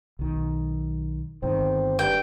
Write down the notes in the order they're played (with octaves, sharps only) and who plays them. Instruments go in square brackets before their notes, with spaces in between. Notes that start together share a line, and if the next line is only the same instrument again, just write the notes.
[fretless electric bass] B1 D#3
[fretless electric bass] G1 D#3 [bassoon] C4
[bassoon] G2 [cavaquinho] G5